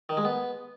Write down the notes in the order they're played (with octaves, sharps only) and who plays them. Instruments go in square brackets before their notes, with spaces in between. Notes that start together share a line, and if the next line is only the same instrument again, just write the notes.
[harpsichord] D#3
G#3
B3